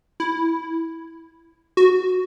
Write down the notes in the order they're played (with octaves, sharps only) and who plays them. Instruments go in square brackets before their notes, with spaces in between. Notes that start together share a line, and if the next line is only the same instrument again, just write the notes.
[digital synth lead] E4
F#4